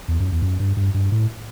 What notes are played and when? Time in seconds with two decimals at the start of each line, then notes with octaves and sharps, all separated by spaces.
0.08 E2
0.20 F#2
0.32 E2
0.42 F#2
0.60 G2
0.77 G2
0.94 G2
1.12 A2